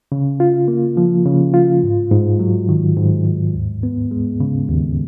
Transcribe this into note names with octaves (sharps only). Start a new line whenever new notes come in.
C#3
F4
A#3
F3
C#3
F4
G#2
G#2
F#3
D#3
G#2
G#2
D#2
B3
G#3
C#3
D#2